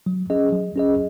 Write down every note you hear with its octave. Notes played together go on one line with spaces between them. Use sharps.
F#3
C#4 G#4 D#5
F#3
C#4 G#4 D#5